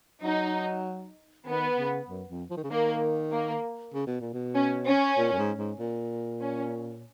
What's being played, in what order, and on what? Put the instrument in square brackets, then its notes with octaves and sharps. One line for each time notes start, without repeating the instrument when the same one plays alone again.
[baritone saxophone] F#3 [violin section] D#4
[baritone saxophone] D#3 [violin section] B3
[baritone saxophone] C#3
F#2
F2
F3
D#3
C#3
[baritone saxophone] D#3 [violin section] A#3
[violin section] A#3
[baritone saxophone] C#3
B2
A#2
B2
[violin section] C#4
C#4
[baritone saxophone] A#2
F#2
G#2
G#2
A#2
[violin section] C#4